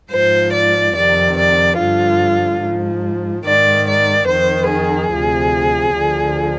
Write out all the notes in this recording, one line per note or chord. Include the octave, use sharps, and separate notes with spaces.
G#2 F3 C5
D5
F2 C3 D#3 D5
D5
G2 D3 F3 F4
G#2 F3
G#2 D#3 D5
D5
F2 D#3 C5
G#4
D2 C3 F3
D2 D3 F3